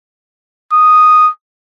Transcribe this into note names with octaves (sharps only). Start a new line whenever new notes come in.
D#6